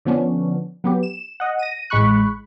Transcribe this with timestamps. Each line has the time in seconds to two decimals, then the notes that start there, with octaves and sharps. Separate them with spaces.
0.05 D3 F3 B3 C#4 D4
0.84 F#3 B3 G4
1.03 E7
1.40 D#5 F#5
1.59 A#6 D#7
1.90 A1 A2 G#3 B5 C#6 F#6